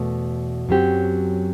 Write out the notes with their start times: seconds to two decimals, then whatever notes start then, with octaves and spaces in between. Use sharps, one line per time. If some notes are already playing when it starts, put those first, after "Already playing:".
Already playing: E2 B2 A3
0.69 F#2 F#3 C4 G4